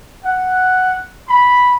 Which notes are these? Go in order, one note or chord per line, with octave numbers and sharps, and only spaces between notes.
F#5
B5